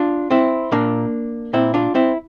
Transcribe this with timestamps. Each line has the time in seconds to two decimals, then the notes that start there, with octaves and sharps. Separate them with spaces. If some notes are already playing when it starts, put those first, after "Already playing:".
Already playing: D4 F4
0.30 C4 E4
0.72 A#2 A#3 D4
1.53 A#2 C4 E4
1.74 D4 F4
1.95 C4 E4